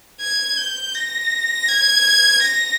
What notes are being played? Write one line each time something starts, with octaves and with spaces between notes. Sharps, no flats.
G#6
G6
A#6
G#6
A#6